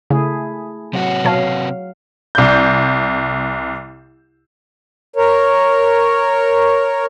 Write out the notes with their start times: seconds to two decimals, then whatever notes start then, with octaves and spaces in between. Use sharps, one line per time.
0.10 C#3 A3 E4 G#4
0.93 C3 F#3 F#4 F#5
1.25 B2 F#3 C#5 F5 A5
2.35 C2 G6
5.16 A#4 C#5